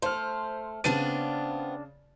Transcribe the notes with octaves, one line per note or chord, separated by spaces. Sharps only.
A3 C5 F6
C#3 B3 C4 D4 F4 A6 D#7